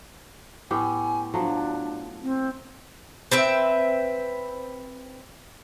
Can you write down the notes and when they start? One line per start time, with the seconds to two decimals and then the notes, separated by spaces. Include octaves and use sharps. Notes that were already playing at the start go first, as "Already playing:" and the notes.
0.71 A2 B3 G4 G#5
1.34 F3 F#3 A3 D4
2.22 C4
3.32 C4 B4 E5